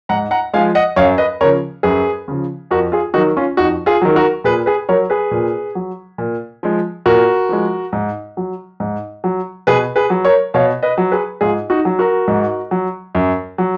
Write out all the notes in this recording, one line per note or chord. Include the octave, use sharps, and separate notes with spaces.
G#2 F#5 A#5
F#5 A#5
F3 G#3 F5 G#5
D#5 F#5
F#2 C#5 F5
B4 D#5
C#3 F3 A#4 C#5
F#2 G#4 B4
C#3 F3
F2 F#4 A#4
F4 G#4
D#3 F#3 D#4 F#4
C#4 F4
F2 D#4 F#4
F4 G#4
D#3 F#3
F#4 A#4
A#2 G#4 B4
G#4 B4
F#3 A#4 C#5
G#4 B4
A#2
F#3
A#2
F3 G#3
A#2 F#4 A#4
F3 G#3
G#2
F#3
G#2
F#3
B2 G#4 B4
G#4 B4
F#3
A#4 C#5
B2 C#5 F5
B4 D#5
F#3
G#4 B4
G#2 F4 G#4
D#4 F#4
F#3
F#4 A#4
G#2
F#3
F#2
F#3